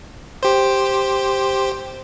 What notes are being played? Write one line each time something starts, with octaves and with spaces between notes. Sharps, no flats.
G4 C5